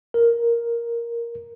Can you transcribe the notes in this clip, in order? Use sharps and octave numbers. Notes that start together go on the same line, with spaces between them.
A#4